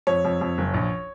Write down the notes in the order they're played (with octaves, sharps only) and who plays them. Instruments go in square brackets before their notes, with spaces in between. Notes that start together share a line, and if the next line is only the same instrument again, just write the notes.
[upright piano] F2 C#5
F2
F2
F#1
A#1